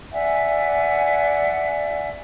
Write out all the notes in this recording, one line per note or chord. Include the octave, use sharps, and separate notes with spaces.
D5 E5 F#5 G#5